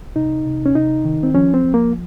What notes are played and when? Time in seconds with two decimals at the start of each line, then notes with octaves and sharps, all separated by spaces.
0.16 C3 D#4
0.46 C3
0.66 C#4
0.75 C3 D#4
1.05 D#3
1.23 C4
1.34 F3 C#4
1.54 C4
1.64 F3
1.74 A#3